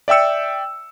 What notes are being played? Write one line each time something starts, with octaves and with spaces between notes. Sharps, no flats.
D5 E5 G5 E6 C#7